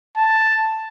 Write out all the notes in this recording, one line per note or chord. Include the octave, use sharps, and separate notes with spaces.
A5